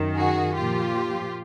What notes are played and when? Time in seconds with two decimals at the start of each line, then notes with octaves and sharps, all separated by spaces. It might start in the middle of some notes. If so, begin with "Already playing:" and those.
Already playing: F#2 D#3
0.15 F#4 G#4
0.56 A#2 F3 F4 G4